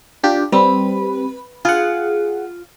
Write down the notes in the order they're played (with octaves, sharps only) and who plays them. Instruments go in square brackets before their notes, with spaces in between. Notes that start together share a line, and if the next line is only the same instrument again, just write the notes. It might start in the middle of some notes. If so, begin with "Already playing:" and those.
[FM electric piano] D4 F4 G4
[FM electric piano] G3 C4 [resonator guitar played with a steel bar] B4
[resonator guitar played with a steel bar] F4 [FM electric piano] G#4 F#5